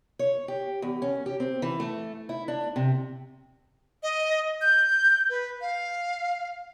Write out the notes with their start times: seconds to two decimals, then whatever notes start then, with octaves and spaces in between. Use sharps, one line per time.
0.19 C#5
0.48 G4
0.82 E2
1.02 C#4
1.26 G4
1.40 C4
1.62 E3
1.80 A3
2.29 E4
2.48 D4
2.76 C3
4.03 D#5
4.61 G6
5.30 B4
5.61 F5